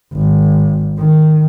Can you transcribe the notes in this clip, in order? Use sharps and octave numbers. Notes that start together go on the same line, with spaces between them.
G#1
D#3